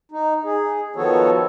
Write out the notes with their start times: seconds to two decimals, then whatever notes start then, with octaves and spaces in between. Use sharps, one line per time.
0.12 D#4
0.44 G#4
0.96 D#3 F3 B3 F#4 A4 C#5